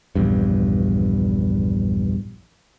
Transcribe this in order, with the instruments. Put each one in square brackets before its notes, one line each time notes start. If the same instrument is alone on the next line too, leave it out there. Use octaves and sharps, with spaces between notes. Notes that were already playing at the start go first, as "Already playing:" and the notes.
[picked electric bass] A#1 E2 G2